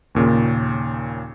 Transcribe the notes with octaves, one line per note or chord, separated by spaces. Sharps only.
D#2 A#2 C#3